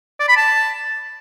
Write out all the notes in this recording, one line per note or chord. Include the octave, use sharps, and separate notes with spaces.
D5
B5
A5